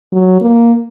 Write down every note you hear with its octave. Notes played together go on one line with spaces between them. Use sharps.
F#3
A#3